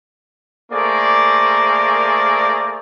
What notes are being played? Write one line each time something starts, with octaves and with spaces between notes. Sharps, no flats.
A3 A#3 G#4 A#4 C5 D5